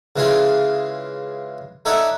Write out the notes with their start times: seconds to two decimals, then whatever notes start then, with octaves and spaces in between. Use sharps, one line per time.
0.16 C#3 E3 G#3 F4 G#4
1.85 D#4 A4 C#5 D5 E5 F#5